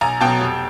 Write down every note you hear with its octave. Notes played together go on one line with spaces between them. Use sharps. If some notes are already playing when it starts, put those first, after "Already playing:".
B1 G#5 A#5
B2 F#3 G5 A5
F1